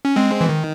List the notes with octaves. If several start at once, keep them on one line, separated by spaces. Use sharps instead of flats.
C#4
G#3 C4
E3
D#3